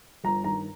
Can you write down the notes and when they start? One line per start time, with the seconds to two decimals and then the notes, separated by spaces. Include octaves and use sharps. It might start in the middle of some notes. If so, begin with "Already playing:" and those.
0.24 G1 A#5
0.44 G2 D#3 A#5